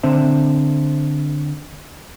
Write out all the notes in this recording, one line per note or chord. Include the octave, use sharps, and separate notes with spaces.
D3 C4 C5 E5